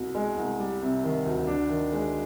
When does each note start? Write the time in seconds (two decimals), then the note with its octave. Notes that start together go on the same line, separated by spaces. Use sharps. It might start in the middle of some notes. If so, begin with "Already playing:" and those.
Already playing: C2 B2
0.15 G#3
0.37 C2
0.59 G3
0.82 C3
1.04 D#3
1.26 D2
1.47 D4
1.70 D#3
1.92 G#3